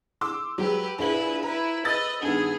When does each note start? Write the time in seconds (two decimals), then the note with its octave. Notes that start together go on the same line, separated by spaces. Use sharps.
0.21 C6 D6 E6
0.58 F#3 G#3 G4 B4
0.98 A#1 E4 G#4 B4 F#7
1.43 E4 B4 A#5
1.85 B4 D#5 D#6 E6 A6
2.22 G2 D#3 B3 G#4